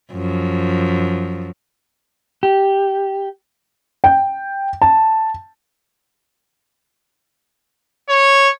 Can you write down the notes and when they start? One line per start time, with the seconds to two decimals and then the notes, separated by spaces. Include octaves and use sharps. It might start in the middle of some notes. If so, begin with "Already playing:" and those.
0.13 F#2 F3
2.43 G4
4.04 G5
4.82 A5
8.10 C#5